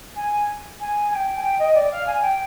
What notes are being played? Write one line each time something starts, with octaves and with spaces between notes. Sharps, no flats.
G#5
G#5
G#5
G5
G#5
G5
D#5
D5
F5
G#5
G5